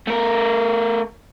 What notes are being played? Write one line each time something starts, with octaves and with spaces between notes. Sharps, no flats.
A3 A#4